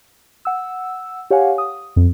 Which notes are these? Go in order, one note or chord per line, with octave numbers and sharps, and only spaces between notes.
F#5 E6
G4 C#5 F5 F#5 G#5
D#6
F2